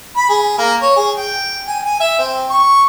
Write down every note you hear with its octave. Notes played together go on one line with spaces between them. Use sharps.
B5
G#4
A#3
C#5
G#4
G5
G#5
G#5
E5
C4
C#6